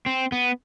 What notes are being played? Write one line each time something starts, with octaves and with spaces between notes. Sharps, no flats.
C4
B3